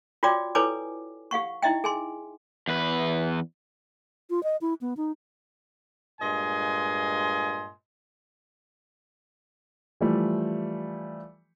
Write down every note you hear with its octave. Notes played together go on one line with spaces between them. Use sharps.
F4 F#4 C#5 D5 G5 D6
E4 A4 B4 C#5 G#5 D6
G4 F5 F#5 C#6
D#4 E4 D#5 E5 G5
G#4 G#5 C6
E2 B4
F4
D#5
E4
B3
D#4
G2 A#2 G#3 D#5 G#5 C6
E3 F3 G3 A3